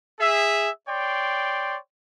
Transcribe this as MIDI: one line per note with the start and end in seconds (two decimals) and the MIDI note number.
0.19 0.70 68
0.19 0.70 76
0.88 1.77 73
0.88 1.77 74
0.88 1.77 79
0.88 1.77 84